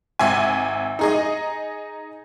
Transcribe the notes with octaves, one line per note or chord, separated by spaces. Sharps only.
G#1 E5 G#5
D#4 G#4 D#5